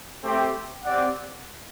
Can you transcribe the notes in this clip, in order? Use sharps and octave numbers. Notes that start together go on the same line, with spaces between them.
A3 C4 G4
C4 G4 D5 F#5